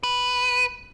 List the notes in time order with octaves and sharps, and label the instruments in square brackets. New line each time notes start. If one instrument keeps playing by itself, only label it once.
[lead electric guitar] B4